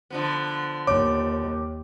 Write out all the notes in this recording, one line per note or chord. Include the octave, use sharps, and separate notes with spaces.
D3 F3 B3
D#2 C#5 D6